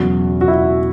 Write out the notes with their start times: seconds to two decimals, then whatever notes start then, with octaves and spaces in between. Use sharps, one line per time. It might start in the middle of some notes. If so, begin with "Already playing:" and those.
Already playing: E1 E2 C#3 F#3 F#4
0.41 F#4
0.48 E4